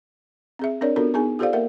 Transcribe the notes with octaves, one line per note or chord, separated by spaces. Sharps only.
C4 G#4 E5
C4 D4 A#4 C#5 D5
B3 D4 F4 F#4 A4 A#4
B3 D#4 G#4 G#5
F4 G4 A4 C5 D5 F5
A#3 A#4 E5 F#5